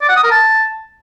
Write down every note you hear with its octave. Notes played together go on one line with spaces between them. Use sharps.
D5
F#5
D#6
A#4
A5